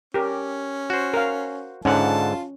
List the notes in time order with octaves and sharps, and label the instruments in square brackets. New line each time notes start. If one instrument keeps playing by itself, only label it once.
[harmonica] C#4 [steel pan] G4 A#4
[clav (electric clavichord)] F#4 C5
[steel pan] A#4 F5
[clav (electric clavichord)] G#2 D3 F#5 [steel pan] C#4 [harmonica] F4 A5